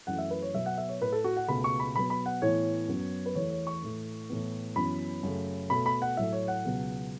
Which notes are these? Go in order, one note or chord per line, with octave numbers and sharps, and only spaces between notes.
F#2 E3 A3 F#5
E5
B4
C#5
B2 F#3 B3 E5
F#5
E5
C#5
A2 A3 B4
A4
F#4
F#5
C#2 B2 A3 B5
C#6
B5
B2 F#3 B3 B5
B5
F#5
A2 E3 B3 C#5
F#2 F#3 B3
B4
E2 E3 A3 C#5
C#5
C#6
A2 E3 A3
A2 E3 B3
F#2 E3 B3 B5
F#2 C#3 A3
B2 A3 B5
B5
F#5
A2 F#3 A3 E5
C#5
F#5
C#2 B2 F#3 B3